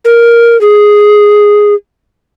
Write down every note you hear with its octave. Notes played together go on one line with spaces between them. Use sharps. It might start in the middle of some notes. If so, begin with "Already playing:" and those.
A#4
G#4